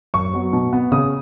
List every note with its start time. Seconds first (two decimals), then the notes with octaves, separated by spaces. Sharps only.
0.14 F#2 C#6
0.33 F#3 B3
0.53 B2
0.73 B3
0.92 C#3 D#6